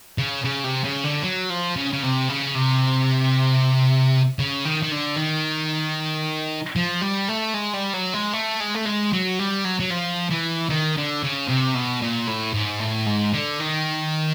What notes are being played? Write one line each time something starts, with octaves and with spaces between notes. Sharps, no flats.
C#3
C#3
C3
C#3
D3
F#3
F3
C#3
C#3
C3
C#3
C3
C#3
D#3
D#3
D3
D#3
F3
G3
A3
G#3
G3
F#3
G#3
A3
G#3
A3
G#3
F#3
G3
F#3
F#3
F3
E3
D#3
D3
C#3
C3
B2
A#2
A2
G#2
A2
G#2
D3
D#3